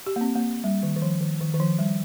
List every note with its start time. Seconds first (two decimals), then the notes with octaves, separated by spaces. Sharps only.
0.06 G4
0.16 A#3
0.21 C4
0.35 A#3
0.64 G3
0.83 D#3
0.96 D#3
1.02 F3
1.21 D#3
1.41 D#3
1.54 D#3
1.60 F3
1.79 G3